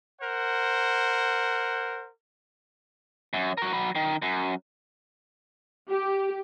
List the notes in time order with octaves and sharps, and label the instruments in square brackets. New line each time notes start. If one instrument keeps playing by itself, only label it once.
[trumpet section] A#4 C5 F#5
[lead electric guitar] F#2
F#4 A#4
F#3 B5
D#3
F#2
[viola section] G4